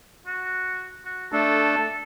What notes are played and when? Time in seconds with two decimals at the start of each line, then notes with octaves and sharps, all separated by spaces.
0.27 F#4
1.05 F#4
1.32 A3 D4 A4